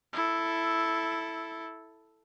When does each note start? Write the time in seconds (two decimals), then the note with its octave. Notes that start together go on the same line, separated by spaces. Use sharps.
0.13 E4 A4